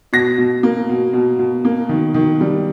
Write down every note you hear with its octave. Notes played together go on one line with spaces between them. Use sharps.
B2 A#6
B2
A#3
B2
B2
B2
A#3
D#3
D#3
G3